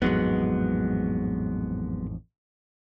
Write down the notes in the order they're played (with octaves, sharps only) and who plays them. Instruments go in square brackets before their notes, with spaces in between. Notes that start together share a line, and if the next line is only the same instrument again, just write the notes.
[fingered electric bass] A1 F2 G#2 [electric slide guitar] F#3 G#3 B3